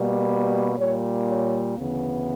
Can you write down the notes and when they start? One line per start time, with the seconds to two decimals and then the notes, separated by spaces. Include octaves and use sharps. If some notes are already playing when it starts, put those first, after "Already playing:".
Already playing: B2 G3 A#3
0.78 A#2 G3 A#3 C#5
1.28 C#5
1.77 D2 C#3 E3 B3